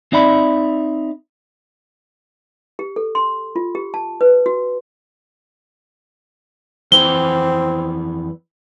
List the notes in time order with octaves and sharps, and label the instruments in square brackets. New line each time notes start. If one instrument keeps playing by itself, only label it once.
[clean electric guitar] C4 D#4 D5 E5 B5
[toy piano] G4
A4
C6
F4
G4
A5
B4
F#4
[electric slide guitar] F2 E3 B4 [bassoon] C4 [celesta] G7